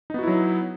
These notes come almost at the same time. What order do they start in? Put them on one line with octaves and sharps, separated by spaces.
D#4 B3 F#4 E4 F#3